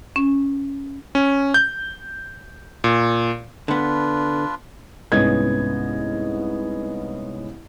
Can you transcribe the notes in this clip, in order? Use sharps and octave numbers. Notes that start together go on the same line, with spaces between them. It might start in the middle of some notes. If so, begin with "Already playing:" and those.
C#4
C#4
G6
A#2
D3 B3 D4 F4 B4
C2 G#2 B3 C#4 D#5 G#6